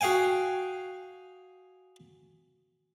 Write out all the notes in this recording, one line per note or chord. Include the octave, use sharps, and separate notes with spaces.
F#4 G#4 F5 G5 G#5